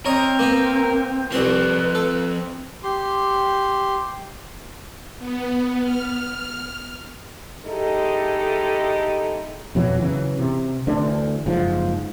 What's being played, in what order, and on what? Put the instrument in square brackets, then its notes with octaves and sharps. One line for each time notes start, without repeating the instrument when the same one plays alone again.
[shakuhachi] C4 [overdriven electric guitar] A#4 [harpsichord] C#5 D#5
[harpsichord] A#3 B3 B4
[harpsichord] C2 C6 [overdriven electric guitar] F3 C4 [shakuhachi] B4
[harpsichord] A4
[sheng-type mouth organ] G4 C6
[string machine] B3
F6
[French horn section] G#3 D#4 E4 G4 A4
[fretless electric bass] F2 B2 E3 F#3
C#3 E3 F#3
C3
D2 D3 E3 D4
F#1 G#2 F3